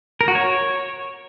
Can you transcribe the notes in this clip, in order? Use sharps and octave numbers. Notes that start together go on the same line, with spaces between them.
A#4
F#4
C#5